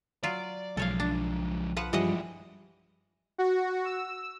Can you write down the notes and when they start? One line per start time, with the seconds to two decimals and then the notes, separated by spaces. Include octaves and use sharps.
0.23 F#3 F4 D5
0.77 B1 F3 G#3 A4 C#5 F5
1.00 D4
1.77 F3 B4 F#5
1.93 G2 E3 F3 G3 G#3 G4 D#5 F#5
3.38 F#4
3.85 E6